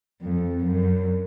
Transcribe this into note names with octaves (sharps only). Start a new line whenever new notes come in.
F2
F#2